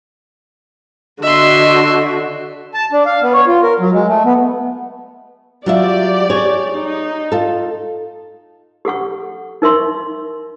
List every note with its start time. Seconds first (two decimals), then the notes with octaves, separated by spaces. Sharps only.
1.23 D3 F#4 D#5 E5 C6
2.74 A5
2.92 D4
3.06 F5
3.22 B3
3.34 C#5
3.47 F4
3.62 A#4
3.80 F#3
3.93 G#3
4.08 A3
4.25 B3
5.66 F#3 F4 G4 D5 E5
6.29 G#4 C#5
6.74 D#4
7.32 F4 A4
8.85 G4 A4 F#5 C#6
9.62 D#4 A#4 E5 C6 C#6